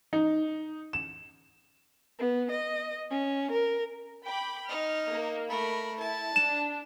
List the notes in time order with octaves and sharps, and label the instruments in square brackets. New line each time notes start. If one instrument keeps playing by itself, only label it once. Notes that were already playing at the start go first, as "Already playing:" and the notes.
[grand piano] D#4
E7
[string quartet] B3
D#5
C#4
A#4
[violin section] G5 B5 D6
[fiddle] D#4 [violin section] F6
[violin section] A#3
[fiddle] A3 A#4 [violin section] B5
[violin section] E4 [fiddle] A5
[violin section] D4 [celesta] E7